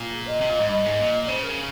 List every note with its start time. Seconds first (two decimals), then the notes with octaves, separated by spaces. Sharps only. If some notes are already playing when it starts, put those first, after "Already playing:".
Already playing: A#2
0.12 G#4
0.26 D#5
0.41 C3
0.50 A#2
0.60 G#2
0.69 G2 D#5
0.85 G#2
0.99 A#2
1.28 C#3 C5
1.43 A#4